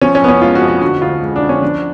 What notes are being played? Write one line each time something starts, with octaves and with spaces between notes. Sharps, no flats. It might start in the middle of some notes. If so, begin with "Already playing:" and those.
F3 C#4
C#4
F2 B3
C#4
G#3 F4
F#4
F2
F#4
D3 F#4
D2 F4
G#3
D4
D2
C#4
F3 D4